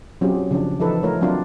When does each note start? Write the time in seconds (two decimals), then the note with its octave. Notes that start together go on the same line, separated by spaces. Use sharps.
0.21 F#3 C4 C#4 F4 G4 G#4
0.51 C#3 F3 D4
0.80 E3 F3 D#4 A4 B4
1.03 A3 F4 A#4 C#5
1.21 F#3 C4 D4 F4